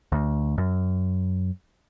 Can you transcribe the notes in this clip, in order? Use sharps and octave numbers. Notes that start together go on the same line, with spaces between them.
D2
F#2